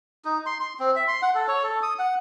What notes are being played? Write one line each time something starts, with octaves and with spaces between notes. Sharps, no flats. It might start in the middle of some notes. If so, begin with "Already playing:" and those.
D#4
C6
C6
C4
E5
C6
F#5
A4
C#5
A4
D#6
F#5